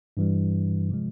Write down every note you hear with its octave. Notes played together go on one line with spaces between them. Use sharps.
G2 E3 G3
C3 F3 G#3